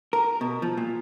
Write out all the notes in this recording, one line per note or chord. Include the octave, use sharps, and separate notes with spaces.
A#4
B2
F3
A#2